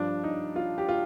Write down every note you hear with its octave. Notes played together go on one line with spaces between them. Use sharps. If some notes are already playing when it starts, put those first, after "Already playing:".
Already playing: G2 F3 D4
D#4
F4
G4
F4